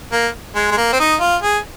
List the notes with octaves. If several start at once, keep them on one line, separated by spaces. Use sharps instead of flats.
A#3
G#3
G#3
A#3
C4
D#4
F4
G#4